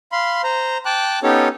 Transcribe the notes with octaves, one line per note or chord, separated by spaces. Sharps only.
F5 B5 C6
C5 A#5
G5 A5 D6 F#6
B3 C#4 D#4 G4 A4 C#5